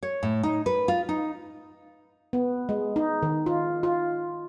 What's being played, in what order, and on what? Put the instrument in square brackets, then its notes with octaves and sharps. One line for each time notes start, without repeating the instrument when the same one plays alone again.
[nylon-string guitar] C#5
A2
D#4
B4
F4
D#4
[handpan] B3
G#3
D#4
D#3
F4
F4